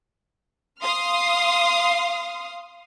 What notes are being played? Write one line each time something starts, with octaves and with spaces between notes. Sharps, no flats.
F5 C6 D#6 F6